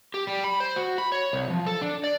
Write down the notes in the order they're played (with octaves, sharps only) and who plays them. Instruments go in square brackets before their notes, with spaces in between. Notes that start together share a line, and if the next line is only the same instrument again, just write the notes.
[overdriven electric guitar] G4
G3
B5
C5
F#4
B5
C#5
C2
F3
A4
D4
D5